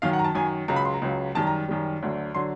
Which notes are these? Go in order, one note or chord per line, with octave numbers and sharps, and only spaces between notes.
F#2 D#3 F#3 F5
F#5
A#5
A5
F#2 D#3 F#3 G#5
C#2 C#3 F#3 A#5
B5
C6
A#5
C#2 C#3 F#3
F#2 D#3 G3 A5
A#5
F#2 D#3 G3
D2 D3 F#3
D3 F#3 C6